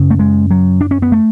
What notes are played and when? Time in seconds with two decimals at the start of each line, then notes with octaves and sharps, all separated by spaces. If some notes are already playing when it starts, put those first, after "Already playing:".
Already playing: F#2 C#3
0.10 A3
0.19 G#3
0.51 F#3
0.81 D4
0.91 C#4
1.02 B3
1.12 A3